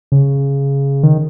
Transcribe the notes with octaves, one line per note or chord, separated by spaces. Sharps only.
C#3
D#3